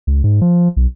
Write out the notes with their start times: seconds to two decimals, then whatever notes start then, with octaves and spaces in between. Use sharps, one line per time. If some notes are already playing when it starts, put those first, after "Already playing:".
0.07 C#2
0.24 G#2
0.41 F3
0.77 B1